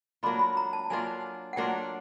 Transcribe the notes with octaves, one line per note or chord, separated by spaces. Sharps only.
F#3 A#3 D4 F4 B5
B5
A#5
A5
F#3 A#3 D4 F4 G#5
F#5
F#3 A#3 D4 F4 G5